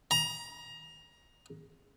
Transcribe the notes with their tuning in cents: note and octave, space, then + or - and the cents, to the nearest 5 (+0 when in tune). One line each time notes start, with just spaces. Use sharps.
A#5 +20